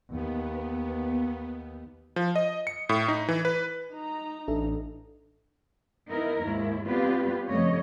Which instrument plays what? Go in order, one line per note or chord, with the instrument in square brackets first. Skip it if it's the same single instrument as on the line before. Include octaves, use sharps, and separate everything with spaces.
[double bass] D#2 [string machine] B3
[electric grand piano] F3
D#5
C#7
A2
D#4
E3
B4
[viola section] D#4 A#5
[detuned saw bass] A1 [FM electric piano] D4 A4 E5
[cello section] B3 D#4 E4 A#4
D#2 G#2 E4
G3 B3 C4 F4 G4 B4
F2 C#3 G3 A3 C#5 D#5